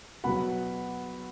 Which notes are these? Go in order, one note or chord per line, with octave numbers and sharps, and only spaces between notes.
B2 F#3 F#5 B5